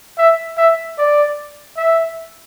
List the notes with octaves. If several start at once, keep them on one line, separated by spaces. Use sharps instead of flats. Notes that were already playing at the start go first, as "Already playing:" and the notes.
E5
E5
D5
E5